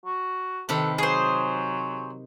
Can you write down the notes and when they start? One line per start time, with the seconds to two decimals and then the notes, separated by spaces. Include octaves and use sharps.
0.06 F#4
0.69 C3 D#3 A4 B4
0.98 F#3 G#4 C5